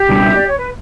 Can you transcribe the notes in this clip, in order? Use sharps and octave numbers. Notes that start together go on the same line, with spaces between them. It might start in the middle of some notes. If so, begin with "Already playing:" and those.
Already playing: G4
C#2 B2 G3 D4
E5
D5
C#5
B4